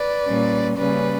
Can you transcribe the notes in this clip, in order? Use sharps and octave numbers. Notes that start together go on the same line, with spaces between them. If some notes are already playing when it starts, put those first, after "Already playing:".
Already playing: B4 D5
A#2 G3 C#4
C#3 G3 A#3 C#4 B4 D5